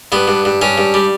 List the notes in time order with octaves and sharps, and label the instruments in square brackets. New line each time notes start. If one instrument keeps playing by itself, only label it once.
[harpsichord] G2 B3
G2
G2
G2 C#4
G2
G3